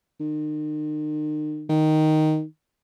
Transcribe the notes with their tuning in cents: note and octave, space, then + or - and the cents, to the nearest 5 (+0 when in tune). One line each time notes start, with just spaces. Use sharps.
D#3 -40
D#3 +0